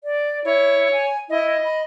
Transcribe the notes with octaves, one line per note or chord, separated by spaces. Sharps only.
D5
E4 C#5
G#5
E4 D#5
B5